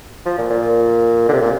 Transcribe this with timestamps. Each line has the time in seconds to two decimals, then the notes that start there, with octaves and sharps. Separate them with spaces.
0.26 F3
0.38 A#2
0.50 A#2
1.28 D3
1.33 C3
1.42 A#2